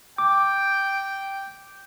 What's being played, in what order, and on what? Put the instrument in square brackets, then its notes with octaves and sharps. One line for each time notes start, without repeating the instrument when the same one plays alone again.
[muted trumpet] G5 [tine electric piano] D6